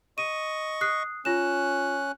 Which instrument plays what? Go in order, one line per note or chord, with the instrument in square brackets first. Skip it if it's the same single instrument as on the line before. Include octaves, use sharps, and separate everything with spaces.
[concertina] D#5 C#6 [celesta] D#7
[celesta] D#6 F#6 C7
[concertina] C#4 F#6 [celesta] F4 E7